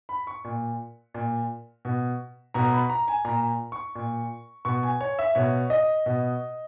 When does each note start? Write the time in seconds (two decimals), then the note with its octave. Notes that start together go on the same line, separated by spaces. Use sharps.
0.09 B5
0.27 C#6
0.44 A#2
1.14 A#2
1.85 B2
2.54 B2 A#5
2.73 B5
2.90 A#5
3.08 G#5
3.25 A#2 A#5
3.72 C#6
3.95 A#2
4.65 B2 C#6
4.83 G#5
5.01 C#5
5.19 E5
5.35 B2 C#5
5.70 D#5
6.06 B2